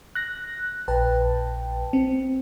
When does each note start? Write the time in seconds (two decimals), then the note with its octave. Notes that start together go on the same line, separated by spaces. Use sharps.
0.15 F#6 A#6
0.88 A#1 B4 G5 A5
1.93 C4